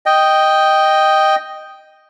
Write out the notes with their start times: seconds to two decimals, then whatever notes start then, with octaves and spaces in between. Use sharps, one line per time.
0.06 D#5 G5